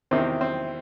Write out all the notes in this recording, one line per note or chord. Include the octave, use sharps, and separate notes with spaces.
E2 C3 D#3 C4
C4